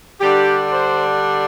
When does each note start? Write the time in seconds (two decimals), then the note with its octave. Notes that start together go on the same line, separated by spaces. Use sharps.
0.21 D3 G3 D4 G4
0.71 C5